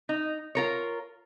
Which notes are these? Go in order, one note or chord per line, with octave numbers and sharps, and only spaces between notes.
D#4
F4 A#4 C#5